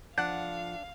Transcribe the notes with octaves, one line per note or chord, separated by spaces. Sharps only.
D2 F3 D4 F5 F#5 F#6